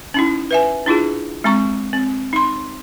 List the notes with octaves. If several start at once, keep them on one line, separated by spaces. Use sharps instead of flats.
C#4 D#4 E4
B4 E5 G#5
D4 E4 F4 G#4
G#3 C4 A#5 C#6
C4
D#4 C6